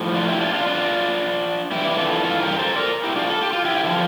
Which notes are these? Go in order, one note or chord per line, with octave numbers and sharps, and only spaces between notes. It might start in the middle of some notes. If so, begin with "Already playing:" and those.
Already playing: A2 F3
D4 F4
E4 G4
D4 F4
D4 F4
D4 F4
G2 E3 E4 G4
F4 A4
F4 A4
G4 A#4
A4 C5
A#4 D5
E4 G4
D4 F4
A4
G4
F4
E4 G4
D3 F3